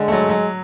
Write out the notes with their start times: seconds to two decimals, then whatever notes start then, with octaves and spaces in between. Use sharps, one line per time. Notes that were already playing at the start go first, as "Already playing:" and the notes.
Already playing: D3 G#3
0.08 F#3 A3
0.29 F#3